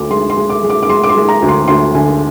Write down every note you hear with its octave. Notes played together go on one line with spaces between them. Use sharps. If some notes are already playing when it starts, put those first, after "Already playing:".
Already playing: D2 D3 D6
G#3 C6
C6
G#3
D6
G#3
D6
D6
G#3 C6
D6
C6
G#3
A#5
D2
C6
D2 C6
D3 G#5